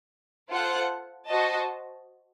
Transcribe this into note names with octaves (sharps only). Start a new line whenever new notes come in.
F4 A4 C5 F#5
F#4 C5 D#5 A5